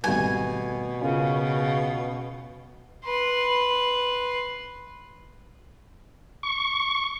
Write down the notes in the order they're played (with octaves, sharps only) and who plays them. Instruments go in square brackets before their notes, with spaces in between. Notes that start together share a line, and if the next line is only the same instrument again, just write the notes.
[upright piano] G#1 G3 A3 [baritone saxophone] B2 [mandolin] G#5
[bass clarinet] C#3 [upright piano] C#4 F4 A#4
[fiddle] B4 C6
[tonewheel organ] C#6